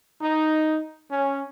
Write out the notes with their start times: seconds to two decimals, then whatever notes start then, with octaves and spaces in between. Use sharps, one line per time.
0.22 D#4
1.10 C#4